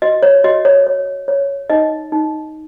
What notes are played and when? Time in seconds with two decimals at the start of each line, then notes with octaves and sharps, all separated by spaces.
0.02 F#4 D#5
0.23 C#5
0.44 F#4 D#5
0.65 C#5
0.87 C#5
1.28 C#5
1.70 D#4 D#5
2.12 D#4